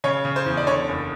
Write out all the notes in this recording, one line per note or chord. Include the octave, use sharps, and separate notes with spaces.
C#3 C#5
C#3
C5
E2
D5
D3 C#5
F#1